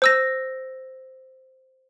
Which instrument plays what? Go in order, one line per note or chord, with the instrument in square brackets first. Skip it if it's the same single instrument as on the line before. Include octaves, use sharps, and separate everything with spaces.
[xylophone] C5 E6 A#6